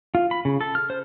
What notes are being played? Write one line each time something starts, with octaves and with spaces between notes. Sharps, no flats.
F4
B5
C#3
A4
F6
C5